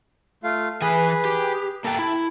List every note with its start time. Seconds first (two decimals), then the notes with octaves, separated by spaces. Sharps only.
0.44 A3 F4 F5
0.82 E3 G#4 B4 G#5
1.25 G4
1.84 A#3 A4 G5 A5
1.99 E4